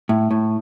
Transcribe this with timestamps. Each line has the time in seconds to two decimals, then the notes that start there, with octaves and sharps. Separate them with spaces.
0.09 A2
0.31 A2